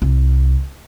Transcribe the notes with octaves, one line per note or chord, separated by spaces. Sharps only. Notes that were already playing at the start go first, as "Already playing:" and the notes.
C2